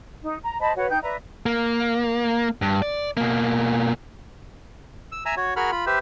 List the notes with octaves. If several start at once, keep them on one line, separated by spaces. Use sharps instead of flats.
D#4
A#5
C5 D#5 A5 B5
F#4 B4 C#5 F#5
D#4 G5 G6
B4 D5 E5 A#5
A#3
G2
D5
B2 A#3
E6
E5 G#5 A#5 E6
F#4 C#5
F#4 G#4 A#4 F#5 B5 F6
F4 B5
G4 B4 C5 E5